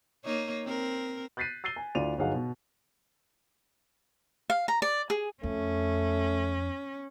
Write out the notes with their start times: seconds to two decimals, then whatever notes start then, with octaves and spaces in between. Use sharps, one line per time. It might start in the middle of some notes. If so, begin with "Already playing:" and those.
0.24 A#3 D#4 C#5
0.65 C4 A#4
1.37 F#6 G6 A6 B6 C7 D#7
1.64 E6 A6 C7 D#7 G7
1.76 G#5
1.95 D2 E4 F4 D5 D#7 F7
2.18 G1 F#3 D#4 G#4 F5 F#5
2.34 B2
4.50 F5
4.68 A#5
4.82 D5
5.10 G#4
5.43 F2 A3 C#4